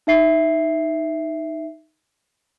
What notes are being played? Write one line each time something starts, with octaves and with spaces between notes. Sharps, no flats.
D#4 E5 C7